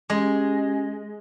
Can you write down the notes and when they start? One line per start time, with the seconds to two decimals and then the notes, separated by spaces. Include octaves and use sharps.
0.10 G#3 C#4 G4 G#5